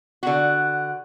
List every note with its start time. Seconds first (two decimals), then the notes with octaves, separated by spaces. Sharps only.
0.23 D3 F#4